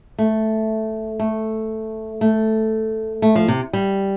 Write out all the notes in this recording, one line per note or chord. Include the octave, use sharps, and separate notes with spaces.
A3
A3
A3
A3
F3
C3
G3